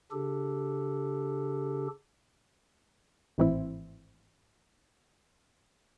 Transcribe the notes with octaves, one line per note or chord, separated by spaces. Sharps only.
C#3 D4 G4 A4
G#1 A2 E3 C4 E4